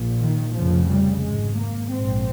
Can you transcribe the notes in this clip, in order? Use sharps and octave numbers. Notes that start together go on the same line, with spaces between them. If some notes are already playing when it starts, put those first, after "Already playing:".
Already playing: A#1 A#2
D#3
F1 F2 C#3 F3
G3
G#1 G#2 G#3
A#3
A#1 G#2 C4